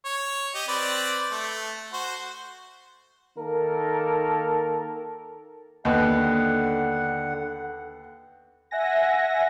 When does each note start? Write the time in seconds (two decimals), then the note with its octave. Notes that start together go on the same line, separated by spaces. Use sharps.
0.05 C#5
0.55 G4 D#5
0.68 C4 B4 D5
1.31 A3
1.93 F#4 C5
3.36 D#3 A#3 A4 A#4
5.85 D#2 D3 B3 F#5
8.71 E5 F#5 G#5 A#6